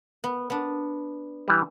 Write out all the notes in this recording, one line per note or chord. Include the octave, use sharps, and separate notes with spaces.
B3
B3 D4
E3 G3